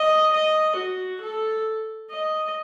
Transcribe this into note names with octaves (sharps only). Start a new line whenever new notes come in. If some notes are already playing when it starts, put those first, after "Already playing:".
Already playing: D#5
D#5
F#4
A4
D#5